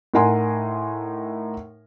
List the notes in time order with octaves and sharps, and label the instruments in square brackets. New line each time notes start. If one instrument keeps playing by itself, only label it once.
[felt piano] A2 D#4 A#4 F#5 G#5 C6